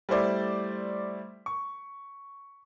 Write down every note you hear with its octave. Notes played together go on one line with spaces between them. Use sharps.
G3 A3 E4 C5 D5
C#6